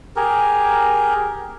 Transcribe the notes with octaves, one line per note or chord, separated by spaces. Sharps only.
G4 G#4 A#4